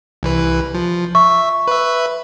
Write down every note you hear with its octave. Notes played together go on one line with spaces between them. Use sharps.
C2 E3 B4
F3
E5 C#6
B4 E5